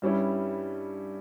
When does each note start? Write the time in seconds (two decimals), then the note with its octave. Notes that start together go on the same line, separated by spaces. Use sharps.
0.02 G2 G3 C#4 E4